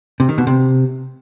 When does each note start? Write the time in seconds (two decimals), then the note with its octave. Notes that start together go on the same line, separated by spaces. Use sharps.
0.20 C3
0.29 D#3
0.38 B2
0.47 C3